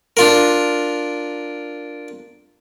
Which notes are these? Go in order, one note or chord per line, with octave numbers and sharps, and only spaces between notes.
D4 F4 A#4